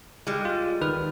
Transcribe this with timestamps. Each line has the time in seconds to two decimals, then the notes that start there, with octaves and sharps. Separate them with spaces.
0.27 G3 G#3
0.45 F4
0.81 D#3 B4 F6